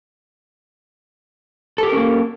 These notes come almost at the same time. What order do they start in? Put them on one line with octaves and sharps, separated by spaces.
A4 G4 A#4 C#4 A#3